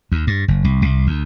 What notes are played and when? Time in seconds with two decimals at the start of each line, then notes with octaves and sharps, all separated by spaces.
0.12 D#2
0.27 G2
0.48 F#1
0.64 C2
0.82 C2
1.07 D2